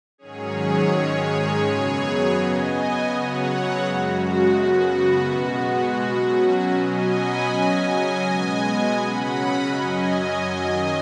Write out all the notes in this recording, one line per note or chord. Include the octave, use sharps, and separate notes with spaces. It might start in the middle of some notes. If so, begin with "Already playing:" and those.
G#2 D#3 F#3 C#4 G#4 C#5
G#2 D#3 G#3 C#4 G#4 C#5
F#2 C#3 F#3 B3
C#3 B3 D#5 G#5
C#3 F#3 B3 C#5 F#5
F#2 C#3 G#3 F#4
F#2 C#3 B3 F#4
B2 G#3 B3 F#4
B2 F#3 C#4
B2 F#3 C#4 D#5 G#5
F#5 B5
C#3 F#3 C#4 D#5 G#5
B2 G#3 B3
C#3 F#3 C#4 F#5 B5
F#2 F#3 C#4 D#5 G#5
F#2 D#3 F#3